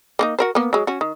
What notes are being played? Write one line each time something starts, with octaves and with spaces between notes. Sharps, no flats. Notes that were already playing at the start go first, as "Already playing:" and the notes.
A#3 B3 D#4
F#4 A#4 C5
A#3 B3
F#3 G#3
C#4 F#4
D#3